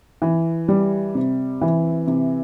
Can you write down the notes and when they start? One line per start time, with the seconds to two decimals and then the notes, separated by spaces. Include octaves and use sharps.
0.22 E3
0.68 G3
1.15 C3
1.62 E3
2.07 C3